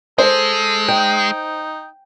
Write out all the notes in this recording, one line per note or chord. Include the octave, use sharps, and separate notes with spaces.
G#3 A4 C5
D#4 G5